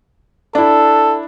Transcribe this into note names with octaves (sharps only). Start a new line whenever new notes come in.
D4 E4 A4